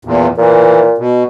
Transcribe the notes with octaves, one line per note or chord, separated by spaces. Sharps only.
E2 A#2
A#2 E3
B2